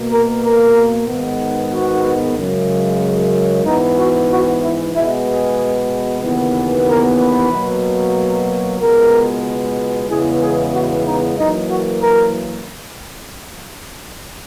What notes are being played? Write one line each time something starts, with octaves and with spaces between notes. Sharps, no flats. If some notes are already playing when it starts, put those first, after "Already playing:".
Already playing: B2 A#3
A#4
A#4
G#2 D#3 G#3 B3
F#4
F#2 C#3 G#3
G#2 E3 B3 D#4
F#4
F#4
E4
B2 G#3 B3 E4
G#4
D#2 C#3 E3 B3
A#4
B4
B2 F#3 A#3
C#2 B2 G#3 B3 A#4
E2 C#3 E3 G#3 B3 G#4
G#4
F#4
D#4
F#2 E3 A#3 D#4
F#4
A#4